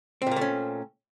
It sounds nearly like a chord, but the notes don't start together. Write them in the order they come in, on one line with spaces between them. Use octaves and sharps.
C4 A#2 A#3 A3 C#4